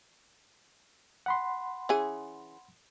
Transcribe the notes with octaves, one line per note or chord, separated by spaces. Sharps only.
F#5 B5 C6
E3 C#4 G#4